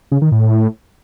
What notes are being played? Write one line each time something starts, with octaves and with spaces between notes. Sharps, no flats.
C#3
D#3
A2